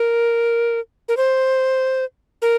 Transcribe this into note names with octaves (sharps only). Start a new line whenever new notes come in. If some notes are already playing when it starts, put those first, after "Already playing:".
Already playing: A#4
A#4
C5
A#4